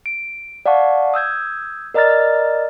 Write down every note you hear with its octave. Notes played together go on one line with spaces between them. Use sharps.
D7
D5 F5 F#5 A5 C#6
D#6 E6 G6 G#6
A#4 D5 D#5 A#5 F6 A6